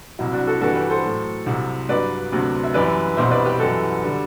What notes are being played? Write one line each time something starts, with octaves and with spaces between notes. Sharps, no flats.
C2 C3 F#3 E4
D4 F#4
F#4 A4
G2 E3 G3 F#4 A4
G4 B4
A4 C5
A2 F#3
C2 C3 F#3
G2 F#3 B4 D5
D2 C3 F#3
E5
F#2 E3 G3 B4 D5
C2 B2 G3 C5 E5
B4 D5
G4 B4
F#2 E3 G3 F#4 A4
D3 G3